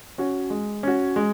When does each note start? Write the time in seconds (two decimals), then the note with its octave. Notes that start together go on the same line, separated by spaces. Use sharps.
0.18 C#4 F#4
0.50 G#3
0.83 C#4 F#4
1.16 G#3